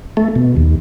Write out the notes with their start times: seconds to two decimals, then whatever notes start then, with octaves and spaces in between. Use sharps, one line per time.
0.17 A3
0.36 B2
0.57 D#2